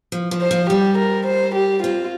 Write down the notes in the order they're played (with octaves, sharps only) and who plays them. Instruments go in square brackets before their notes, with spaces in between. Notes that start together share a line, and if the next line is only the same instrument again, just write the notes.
[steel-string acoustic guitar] F3
F3
[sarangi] C5
[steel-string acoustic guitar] F3
[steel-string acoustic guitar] G3 [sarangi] G4
[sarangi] A#4
C5
G4
[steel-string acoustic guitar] C4 [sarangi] F4